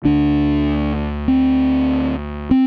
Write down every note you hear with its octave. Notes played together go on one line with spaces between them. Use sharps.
D2 D3 D4
C4
C4